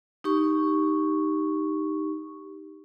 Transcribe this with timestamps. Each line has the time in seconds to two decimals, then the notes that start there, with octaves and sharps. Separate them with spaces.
0.24 D#4 G4 C#6